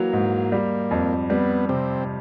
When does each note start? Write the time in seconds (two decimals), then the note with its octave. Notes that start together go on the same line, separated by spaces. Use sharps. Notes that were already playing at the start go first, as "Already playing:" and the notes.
Already playing: E3 F#3 A#3
0.13 G#2
0.52 G3
0.91 F2
1.30 G3 B3
1.69 C3 C4